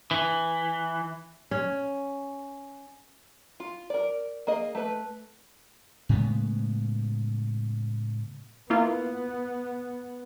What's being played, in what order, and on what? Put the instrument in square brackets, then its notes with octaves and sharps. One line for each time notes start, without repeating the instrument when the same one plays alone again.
[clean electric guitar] E3
[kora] C#4
[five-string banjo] F4
A#4 D5
A#3 G#4 D#5
A3 B4
[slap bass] A2 C#3 G#3 B3
[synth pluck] A#3 E4 F4 [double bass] B3